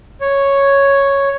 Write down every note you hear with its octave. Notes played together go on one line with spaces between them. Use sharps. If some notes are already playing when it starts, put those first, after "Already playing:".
C#5